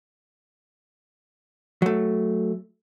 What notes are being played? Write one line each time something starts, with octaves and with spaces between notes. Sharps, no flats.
F#3 A3